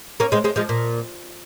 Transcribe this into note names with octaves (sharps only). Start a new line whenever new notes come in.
A#3 C#4
G#3 C4
G#3 C4
F3 G#3
A#2